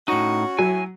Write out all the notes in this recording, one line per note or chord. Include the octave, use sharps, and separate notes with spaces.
A2 C#4 D#4 F#4
A2 F#3 G#5